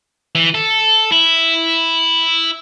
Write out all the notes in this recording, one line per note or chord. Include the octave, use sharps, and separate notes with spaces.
E3
A4
E4